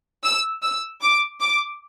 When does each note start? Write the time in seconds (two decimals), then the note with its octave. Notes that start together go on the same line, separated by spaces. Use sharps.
0.24 E6
0.62 E6
1.01 D6
1.40 D6